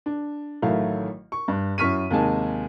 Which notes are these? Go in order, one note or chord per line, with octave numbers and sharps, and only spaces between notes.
D4
A1 D#3 F#3 A3 E4 F5
C#6
G2
F#2 E4 C#6 F6 B6 D#7
D#2 C3 G#3 D#4 G#5 A5